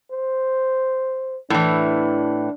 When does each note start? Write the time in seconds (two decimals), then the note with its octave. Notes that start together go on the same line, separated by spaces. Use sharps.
0.11 C5
1.50 A2 E3 D4